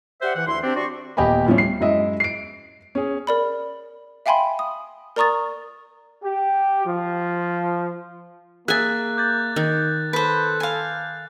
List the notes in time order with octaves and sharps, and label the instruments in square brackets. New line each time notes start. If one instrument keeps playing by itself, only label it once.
[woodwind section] G4 C5 D5 E5 F#5
E3 F#5
D2 E4 E5 C6
C4 D4 G4
D4 F#4 G4 D5 C6 C#6
[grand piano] D#1 E2 G4 D#5 G#5 B5
A2 F3 G3 C#4
C7
F#2 G#3 E4 D#5 E5
C7 D7
C#4 G#4
[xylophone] A#4 D5 B5
E5 F5 G5 G#5 B5 C6
D#6
A#4 D5 A#5 C#6 D#6 A6
[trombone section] G4
F3
[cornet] A#3 [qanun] G#4 G#5 [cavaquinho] E5 [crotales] F#6 A6
[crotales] D6 G6 A6
[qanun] D#3
[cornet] A4 [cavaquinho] B4 C5
[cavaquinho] F5 G#5